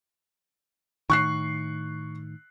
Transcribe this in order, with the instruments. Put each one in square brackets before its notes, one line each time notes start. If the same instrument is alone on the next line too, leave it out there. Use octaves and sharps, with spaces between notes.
[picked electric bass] A2 D#3 [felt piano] C#6 F#6 C7